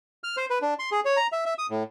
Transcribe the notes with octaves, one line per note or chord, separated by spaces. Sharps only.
F6
C5
B4
D4
C6
G#4
C#5
A#5
E5
E5
D#6
A2